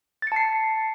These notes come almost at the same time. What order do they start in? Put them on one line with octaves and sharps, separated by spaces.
A6 C#7 A5 C7